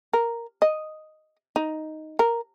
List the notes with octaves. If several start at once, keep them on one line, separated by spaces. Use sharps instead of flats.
A#4
D#5
D#4
A#4